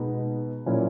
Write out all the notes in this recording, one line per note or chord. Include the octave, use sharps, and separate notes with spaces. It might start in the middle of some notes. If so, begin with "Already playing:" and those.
Already playing: B2 G#3 B3 D#4
A#2 F#3 A#3 C#4 E4